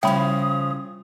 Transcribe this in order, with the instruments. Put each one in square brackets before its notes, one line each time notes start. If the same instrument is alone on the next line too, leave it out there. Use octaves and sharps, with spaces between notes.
[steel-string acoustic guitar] C#3 F3 [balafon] G3 [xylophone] G5 B5 [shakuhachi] D#6